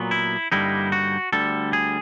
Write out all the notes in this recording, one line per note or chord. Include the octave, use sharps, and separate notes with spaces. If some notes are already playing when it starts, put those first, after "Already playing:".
Already playing: A#2 F#3 B3
E4
G2 D3 G3 A#3 D#4 E4
F#4
D2 D3 G3 A4
G#4